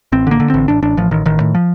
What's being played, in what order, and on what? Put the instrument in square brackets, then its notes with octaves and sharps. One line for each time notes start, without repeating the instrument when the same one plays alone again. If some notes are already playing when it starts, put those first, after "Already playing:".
[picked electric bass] A1 C4
D3
A#3
D3
A1 C4
A1 D4
A1 D4
A1 F3
A1 D#3
A1 D#3
A2
F3